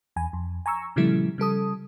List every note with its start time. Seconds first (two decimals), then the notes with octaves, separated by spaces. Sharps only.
0.16 E2 G#5
0.33 F2
0.66 G#5 A#5 C#6 E6
0.96 A#2 C#3 F3 G3 A3 E4
1.38 C#3 G3 A4 D#6